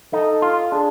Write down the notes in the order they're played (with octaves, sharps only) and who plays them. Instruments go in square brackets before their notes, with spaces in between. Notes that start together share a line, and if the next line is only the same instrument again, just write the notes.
[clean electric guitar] D#4 [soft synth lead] A4
[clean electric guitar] F4
[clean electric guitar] D4 [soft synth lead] G#4